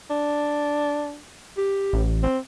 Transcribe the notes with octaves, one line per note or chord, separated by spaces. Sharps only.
D4
G4
A1
C4